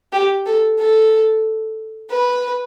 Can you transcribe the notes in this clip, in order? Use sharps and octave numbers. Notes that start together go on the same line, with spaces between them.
G4
A4
A4
B4